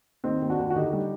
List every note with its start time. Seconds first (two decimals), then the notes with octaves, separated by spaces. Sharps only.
0.24 D#2 C4 D#4
0.42 D#2
0.50 D4 F#4
0.59 D#2
0.70 F#4
0.76 D3 D#4 G4
0.93 G3